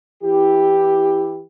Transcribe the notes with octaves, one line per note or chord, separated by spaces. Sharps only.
E3 E4 G4